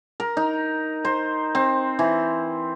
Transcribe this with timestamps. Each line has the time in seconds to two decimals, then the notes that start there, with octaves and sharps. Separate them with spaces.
0.20 A#4
0.37 D#4
1.05 C5
1.55 C4
1.99 E3